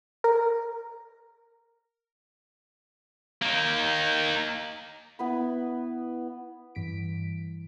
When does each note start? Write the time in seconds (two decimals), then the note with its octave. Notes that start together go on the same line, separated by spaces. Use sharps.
0.24 A#4
3.43 A#3 D#4
5.19 B3 E4 B4 B5
6.75 G2 E3 B6 D7